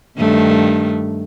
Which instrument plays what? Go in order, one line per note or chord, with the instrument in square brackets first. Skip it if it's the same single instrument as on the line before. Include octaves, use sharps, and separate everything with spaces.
[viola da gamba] G2 D#3 A3